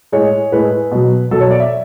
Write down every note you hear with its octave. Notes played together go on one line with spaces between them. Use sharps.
A2 G#3 C#5
A2 G#3 B4
B2 F#3
B2 F#3 A4
C#5
D5
E5